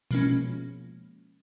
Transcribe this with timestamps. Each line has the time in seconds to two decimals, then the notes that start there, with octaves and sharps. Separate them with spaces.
0.11 B2 F3 G#3 A#3 C#4